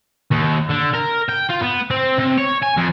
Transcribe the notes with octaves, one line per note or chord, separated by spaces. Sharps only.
D#2
D3
A#4
G5
F4
B3
C4
C3
C#5
G#5
F2